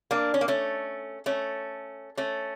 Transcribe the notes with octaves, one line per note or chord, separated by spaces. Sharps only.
A#3 D4
C#4
A#3
A3 C#4
A3 C#4
A3 C#4